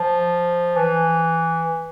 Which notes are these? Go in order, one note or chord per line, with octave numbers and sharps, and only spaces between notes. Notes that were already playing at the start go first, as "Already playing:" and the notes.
Already playing: F3
E3